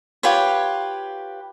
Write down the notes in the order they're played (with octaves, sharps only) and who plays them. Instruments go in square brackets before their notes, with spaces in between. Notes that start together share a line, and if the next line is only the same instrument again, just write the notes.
[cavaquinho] F4 G4 B4 C#5